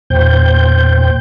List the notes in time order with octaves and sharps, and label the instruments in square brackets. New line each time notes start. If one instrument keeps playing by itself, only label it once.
[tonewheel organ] E2 A#2 C5 G5 G6